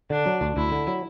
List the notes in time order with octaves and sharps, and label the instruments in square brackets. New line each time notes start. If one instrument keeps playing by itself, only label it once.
[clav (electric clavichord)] D3 [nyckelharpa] D4
[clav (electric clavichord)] F#3
D2
[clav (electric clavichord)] D2 [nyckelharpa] E4
[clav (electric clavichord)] D3
F#3